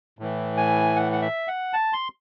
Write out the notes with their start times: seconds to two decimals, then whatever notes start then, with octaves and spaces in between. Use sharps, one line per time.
0.19 A2 E3
0.57 G#5
0.96 F#5
1.12 F#5
1.22 E5
1.48 F#5
1.73 A5
1.93 C6